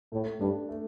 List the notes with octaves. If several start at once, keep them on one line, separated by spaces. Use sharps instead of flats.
A2 A3
G2 D4
A3